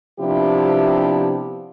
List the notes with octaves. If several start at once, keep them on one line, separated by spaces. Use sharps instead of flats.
C3 F3 B3 D4 E4 G4